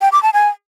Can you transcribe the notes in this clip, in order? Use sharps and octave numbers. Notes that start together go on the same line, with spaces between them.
G5
D6
A5
G#5